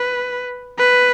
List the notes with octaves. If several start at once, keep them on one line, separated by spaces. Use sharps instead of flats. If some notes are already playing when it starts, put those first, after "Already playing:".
Already playing: B4
B4